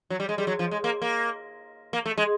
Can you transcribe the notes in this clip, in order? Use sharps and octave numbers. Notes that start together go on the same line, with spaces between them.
F#3
G3
G#3
G3
F#3
F3
G#3
A#3
A#3
A#3
A3
G#3